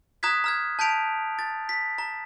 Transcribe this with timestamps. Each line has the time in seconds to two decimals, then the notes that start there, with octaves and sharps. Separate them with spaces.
0.23 A#5 D#6 F#6 G#6 B6
0.44 A#5 F6 G#6
0.79 A5 G6 B6 D7 F7
1.39 A6
1.69 B6
1.98 A#5